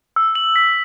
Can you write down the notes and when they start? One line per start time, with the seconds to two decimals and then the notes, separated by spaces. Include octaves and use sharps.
0.16 E6
0.35 F#7
0.56 B6